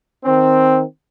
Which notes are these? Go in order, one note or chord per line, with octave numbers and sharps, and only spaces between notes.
D#3 C4